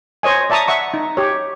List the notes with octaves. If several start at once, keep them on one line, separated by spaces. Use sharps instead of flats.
C5 C#5 D#5 G#5
D5 E5 A5 A#5 C#6 D#6
E5 F#5 C#6
D#4
G4 C#5